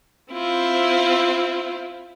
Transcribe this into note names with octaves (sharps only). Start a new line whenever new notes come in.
C4 E4 F4